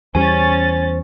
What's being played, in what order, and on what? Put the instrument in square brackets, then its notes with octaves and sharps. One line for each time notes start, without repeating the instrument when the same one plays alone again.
[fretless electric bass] E2 G3 [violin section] C#4 A6 [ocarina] C5 [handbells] G#5